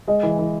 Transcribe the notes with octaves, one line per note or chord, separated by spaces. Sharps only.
G#3 D#5
E3
E3